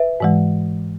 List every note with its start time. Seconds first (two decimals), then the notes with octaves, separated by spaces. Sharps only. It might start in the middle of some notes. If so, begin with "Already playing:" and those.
Already playing: B4 E5
0.20 G#2 E3 G#3